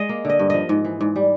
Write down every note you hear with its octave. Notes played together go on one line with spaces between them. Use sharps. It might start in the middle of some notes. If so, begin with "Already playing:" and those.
Already playing: G#3 D#5
A#3
D3 D#5
G2
F3 D#5
G#2
E3
G#2
G3